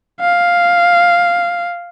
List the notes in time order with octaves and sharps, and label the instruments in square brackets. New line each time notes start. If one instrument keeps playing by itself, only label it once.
[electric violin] F5